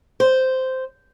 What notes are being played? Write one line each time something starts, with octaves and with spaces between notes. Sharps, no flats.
C5